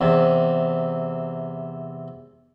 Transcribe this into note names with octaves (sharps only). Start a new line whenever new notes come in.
E2 C3